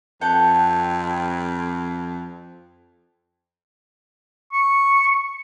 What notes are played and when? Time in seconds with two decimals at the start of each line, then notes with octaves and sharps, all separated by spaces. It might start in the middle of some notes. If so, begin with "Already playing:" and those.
0.21 F2 A4 F#5 G5
4.53 C#6